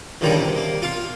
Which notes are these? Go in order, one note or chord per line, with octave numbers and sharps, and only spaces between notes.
C#2 A#2 D3 D#3 F3 G3
C3
A#3
F4 F5